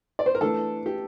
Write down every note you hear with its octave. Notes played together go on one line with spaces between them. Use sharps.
D5
C5
A#4
E3 A3 D4 A4
G4